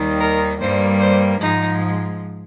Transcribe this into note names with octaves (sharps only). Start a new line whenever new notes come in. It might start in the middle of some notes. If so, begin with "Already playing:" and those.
Already playing: D#2 D#3 G3
A#4
G2 G3 A#3 C5
C5
G#2 F3 G#3 D#4